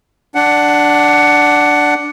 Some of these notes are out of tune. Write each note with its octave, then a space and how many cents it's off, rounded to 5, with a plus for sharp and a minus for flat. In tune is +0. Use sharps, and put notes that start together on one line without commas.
D4 +0 F#5 +10